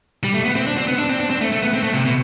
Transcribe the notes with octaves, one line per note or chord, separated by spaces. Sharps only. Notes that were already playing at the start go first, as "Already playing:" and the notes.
G3
A3
B3
C4
D4
C4
B3
D4
C4
D4
C4
A3
A3
B3
C4
A3
C3
B2